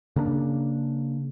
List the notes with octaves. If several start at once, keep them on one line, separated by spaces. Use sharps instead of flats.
C#3 A#3 B3 D4